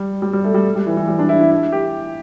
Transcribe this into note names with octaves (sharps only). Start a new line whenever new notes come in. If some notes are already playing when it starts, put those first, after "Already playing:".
Already playing: G3
G3
G3
A3
G3
G3
E3
E3
G3
D4
E4
E4
E4
G4